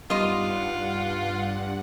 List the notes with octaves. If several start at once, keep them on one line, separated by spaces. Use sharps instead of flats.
G2 G3 B3 D#4 F4 D#5 F#5 C6